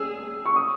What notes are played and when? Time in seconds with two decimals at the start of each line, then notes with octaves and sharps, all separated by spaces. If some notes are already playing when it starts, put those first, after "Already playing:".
Already playing: G#4 E6
0.45 C#6
0.56 D#6